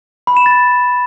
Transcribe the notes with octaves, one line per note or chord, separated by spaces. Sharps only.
B5
E7
A6